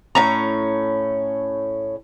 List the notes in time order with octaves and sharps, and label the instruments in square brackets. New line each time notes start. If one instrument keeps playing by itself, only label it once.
[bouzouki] A2 C#4 A#5